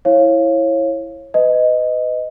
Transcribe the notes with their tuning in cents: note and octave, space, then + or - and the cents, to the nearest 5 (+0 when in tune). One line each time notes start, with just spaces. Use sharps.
E4 +0 C#5 -25 F5 -15
B4 +35 D#5 +0